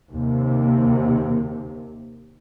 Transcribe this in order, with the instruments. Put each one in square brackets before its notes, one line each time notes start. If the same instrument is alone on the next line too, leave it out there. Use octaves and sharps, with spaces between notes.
[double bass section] D#2 C3